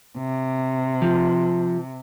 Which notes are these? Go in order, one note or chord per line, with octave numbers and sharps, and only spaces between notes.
C3
F3